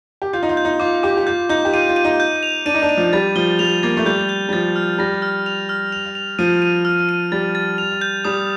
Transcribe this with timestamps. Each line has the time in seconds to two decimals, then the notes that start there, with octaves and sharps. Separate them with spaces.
0.22 G4
0.33 F4 G6
0.43 D#4
0.49 F4
0.57 G6
0.65 D#4
0.80 F4 D6
1.03 G4 D6
1.17 G4
1.27 F4 G6
1.49 D#4 G6
1.65 G4
1.73 F4 D#7
1.89 F4
1.96 D#7
2.05 D#4
2.20 G6
2.43 F7
2.66 D4 D#7
2.74 D#4
2.82 D4
2.89 D#7
2.97 F3
3.13 G3 A6
3.36 F3 G7
3.59 G3 F7
3.83 A#3 A6
3.97 A3
4.05 G3 G6
4.29 G6
4.49 G3
4.53 F3 A6
4.76 F6
4.99 G3 A#6
5.22 F6
5.46 F7
5.69 F6
5.92 F7
6.15 F7
6.39 F3 D#7
6.62 D#7
6.85 F6
7.09 D#7
7.32 G3 A6
7.55 A6
7.78 F7
8.01 G6
8.25 G3 D#6